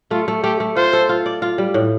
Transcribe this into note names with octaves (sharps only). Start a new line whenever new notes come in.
A3 F4
A3
A3 G4
A3
F4 C5
A4
F4
D5
F4
G3
A2